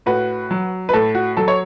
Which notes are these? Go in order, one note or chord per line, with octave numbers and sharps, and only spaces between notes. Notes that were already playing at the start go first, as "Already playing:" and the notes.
A2 F#4 B4
F#3
B4
A2 A4
F#4
F#3 A4
C#5